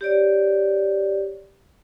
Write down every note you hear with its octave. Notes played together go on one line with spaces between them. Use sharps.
G4 C#5 D5